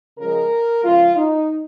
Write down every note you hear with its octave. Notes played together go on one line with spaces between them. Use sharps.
C#3 F3 G#3 A#4
C#3 F3 G#3 F4
D#4